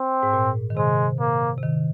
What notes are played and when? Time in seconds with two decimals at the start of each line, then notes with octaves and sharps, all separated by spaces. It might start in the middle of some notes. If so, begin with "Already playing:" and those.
Already playing: C4
0.23 G#2
0.33 A#2
0.70 D#3
0.77 C3 G#3
1.20 A#3
1.58 C3
1.63 D#3